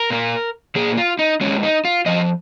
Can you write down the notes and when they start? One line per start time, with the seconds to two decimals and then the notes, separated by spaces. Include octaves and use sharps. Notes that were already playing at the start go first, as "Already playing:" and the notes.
Already playing: A#4
0.10 A#2 A#3
0.75 A#2 A#3 G#4
0.97 F4
1.19 D#4
1.41 F2 F3 G#3 C#4
1.63 D#4
1.85 F4
2.06 F2 F3 D#5